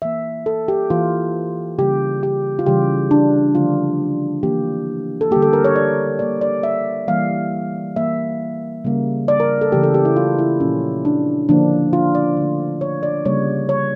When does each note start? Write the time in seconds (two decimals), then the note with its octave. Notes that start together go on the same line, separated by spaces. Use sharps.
0.02 E3 A#3 E5
0.46 A4
0.68 G4
0.90 E3 A#3 F4
1.78 C#3 G3 A#3 G4
2.23 G4
2.59 F4
2.66 C#3 E3 G3 G4
3.11 D4
3.55 D3 F3 A3 F4
4.43 E3 A#3 G4
5.21 A4
5.31 D3 G3 A#3 G4
5.42 A4
5.53 A#4
5.65 C#5
5.76 D5
6.19 D3 G3 A#3 D5
6.41 D5
6.63 E5
7.08 E3 G3 A#3 F5
7.96 E3 A#3 E5
8.84 C#3 G3 A#3
9.28 D5
9.40 A#4
9.61 A4
9.72 C#3 E3 A3 G4
9.83 A4
9.94 G4
10.05 E4
10.16 F4
10.39 E4
10.60 A#2 F3 A#3 C#4
11.05 D4
11.49 D3 F3 A#3 D4
11.93 F4
12.15 D5
12.37 D3 A3
12.81 C#5
13.03 D5
13.25 C#3 G3 A#3 C#5
13.69 C#5